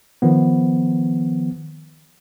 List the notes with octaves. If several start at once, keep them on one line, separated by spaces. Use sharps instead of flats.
D#3 F3 B3